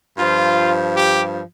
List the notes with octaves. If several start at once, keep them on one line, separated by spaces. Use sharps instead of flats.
G2 F3 F4
G4